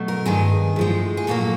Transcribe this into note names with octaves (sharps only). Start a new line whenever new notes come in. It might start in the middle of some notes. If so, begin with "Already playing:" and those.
Already playing: B2 F#3 A3
A#4
G2 D#3 G#3 G#4
A2 F3 G#3
G#4
A#2 F#3 A#3 A4